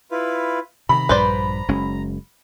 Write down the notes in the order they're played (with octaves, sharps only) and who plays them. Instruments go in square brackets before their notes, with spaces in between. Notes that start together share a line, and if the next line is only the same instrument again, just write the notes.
[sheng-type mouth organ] E4 F4 B4
[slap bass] C3 D#3 [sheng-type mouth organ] A#5 [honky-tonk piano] B5
[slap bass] A#1 G2 [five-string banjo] B4 C5 D5
[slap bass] F#1 G#3 C#4